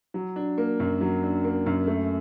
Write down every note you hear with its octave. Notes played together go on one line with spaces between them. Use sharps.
F#3
D4
A#3
F#2
F#3
D4
A#3
F#2
A3